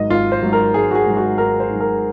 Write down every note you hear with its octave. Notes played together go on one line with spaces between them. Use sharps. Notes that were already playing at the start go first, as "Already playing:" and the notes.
Already playing: G#1 G#2 F#3 D#5
G#1 F4
C5
G#2 F#3
A#4
G#1 G#4
F#4
G#4
G#2 F#3
F#4
G#1 A#4
C5
G#2
F#3
A#4